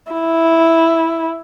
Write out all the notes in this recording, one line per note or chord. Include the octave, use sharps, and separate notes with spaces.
E4